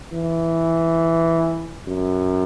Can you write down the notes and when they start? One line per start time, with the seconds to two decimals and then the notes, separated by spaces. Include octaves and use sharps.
0.13 E3
1.88 F#2